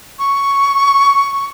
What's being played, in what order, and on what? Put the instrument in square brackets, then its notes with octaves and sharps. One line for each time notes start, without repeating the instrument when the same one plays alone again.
[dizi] C#6